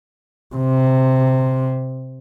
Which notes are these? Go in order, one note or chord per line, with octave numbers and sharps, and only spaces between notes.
C3